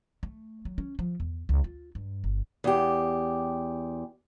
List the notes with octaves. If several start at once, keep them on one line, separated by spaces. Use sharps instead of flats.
A3
F#3
C#4
F3
E2
C#2
F4
G2
G1
E2 G4